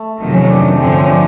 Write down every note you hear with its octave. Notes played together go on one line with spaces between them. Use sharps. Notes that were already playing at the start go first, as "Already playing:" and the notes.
Already playing: A3
F2 C3 D#3 F#3
C#4
D4
G2 D3 F3 C4
C#4
D4